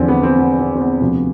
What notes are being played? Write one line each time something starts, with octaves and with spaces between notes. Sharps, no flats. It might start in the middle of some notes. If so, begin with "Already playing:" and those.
Already playing: E2 D3 F3 C4 D4
B3
C4
B3
C4
C4
B3
D2 C3 F3